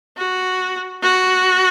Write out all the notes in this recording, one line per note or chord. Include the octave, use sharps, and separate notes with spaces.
F#4
F#4